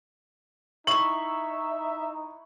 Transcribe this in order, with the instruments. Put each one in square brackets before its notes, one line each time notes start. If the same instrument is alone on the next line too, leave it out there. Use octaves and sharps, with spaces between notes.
[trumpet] D#4 [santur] E4 C#6 [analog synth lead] E5 [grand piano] F#7